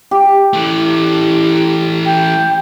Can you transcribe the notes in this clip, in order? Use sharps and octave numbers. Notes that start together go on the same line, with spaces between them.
G4
E3 A3
G5